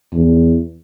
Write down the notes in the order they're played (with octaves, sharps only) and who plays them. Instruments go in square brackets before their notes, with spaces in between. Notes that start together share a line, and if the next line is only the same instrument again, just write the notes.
[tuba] E2